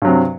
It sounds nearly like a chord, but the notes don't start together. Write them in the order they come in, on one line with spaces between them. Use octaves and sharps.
G2 F#3 C3